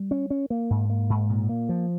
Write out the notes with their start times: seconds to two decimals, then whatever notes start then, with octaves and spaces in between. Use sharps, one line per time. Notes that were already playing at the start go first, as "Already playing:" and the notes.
Already playing: G3
0.11 C#4
0.30 C#4
0.50 A#3
0.70 G#2
0.90 A#3
1.10 G#2
1.30 A#2
1.49 A#3
1.69 F3